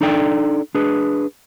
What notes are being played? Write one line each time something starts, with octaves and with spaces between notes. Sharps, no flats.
D4 D#4 A4 D5 G5
D4 G#4 B4